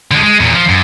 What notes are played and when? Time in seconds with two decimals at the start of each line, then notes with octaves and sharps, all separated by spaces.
0.11 D3 G#3
0.23 G#3
0.40 E2 A#2
0.55 F3
0.69 F#2